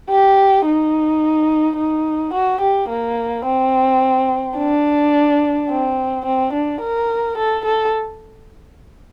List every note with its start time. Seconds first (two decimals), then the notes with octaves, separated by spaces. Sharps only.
0.10 G4
0.66 D#4
1.77 D#4
2.34 F#4
2.61 G4
2.90 A#3
3.45 C4
4.57 D4
5.69 C4
6.26 C4
6.53 D4
6.81 A#4
7.38 A4
7.65 A4